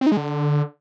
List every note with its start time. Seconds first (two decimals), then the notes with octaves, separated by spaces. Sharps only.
0.01 C4
0.06 D#4
0.12 G#3
0.17 D3